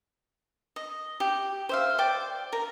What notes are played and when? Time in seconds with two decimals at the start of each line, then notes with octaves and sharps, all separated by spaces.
0.76 D#5
1.20 G4
1.69 C5 E5 F5
1.98 D5 G5 D6
2.52 A#4